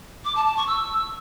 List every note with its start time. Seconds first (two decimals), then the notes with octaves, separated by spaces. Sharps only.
0.25 D6
0.35 A5
0.46 A5
0.57 C#6
0.67 E6